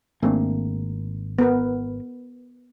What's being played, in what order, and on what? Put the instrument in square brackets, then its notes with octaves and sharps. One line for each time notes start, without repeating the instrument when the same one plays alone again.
[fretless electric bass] G#1 A#3 [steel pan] A3 C4 D4
[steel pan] B3 A#4 B4